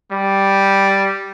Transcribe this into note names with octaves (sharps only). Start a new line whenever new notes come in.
G3